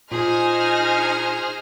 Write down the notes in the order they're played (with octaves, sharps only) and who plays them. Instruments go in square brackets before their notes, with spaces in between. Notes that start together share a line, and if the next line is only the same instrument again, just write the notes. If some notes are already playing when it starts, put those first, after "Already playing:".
[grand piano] A#2 [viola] D#4 [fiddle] G#4 [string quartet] C5 G#5 F6